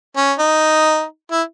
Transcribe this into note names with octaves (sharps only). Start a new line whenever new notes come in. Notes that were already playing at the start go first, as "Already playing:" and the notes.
C#4
D#4
E4